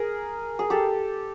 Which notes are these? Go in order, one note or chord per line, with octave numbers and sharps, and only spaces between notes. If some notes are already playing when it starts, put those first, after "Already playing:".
Already playing: G#4 A#4
G#4
G4 A4